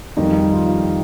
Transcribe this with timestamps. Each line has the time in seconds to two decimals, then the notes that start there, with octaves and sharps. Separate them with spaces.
0.17 F2 D#3 G3 D#4
0.53 F4